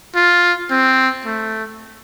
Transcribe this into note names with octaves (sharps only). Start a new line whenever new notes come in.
F4
C4
A3